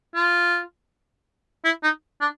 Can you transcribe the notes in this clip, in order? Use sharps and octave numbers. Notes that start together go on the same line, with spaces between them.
F4
E4
D#4
D4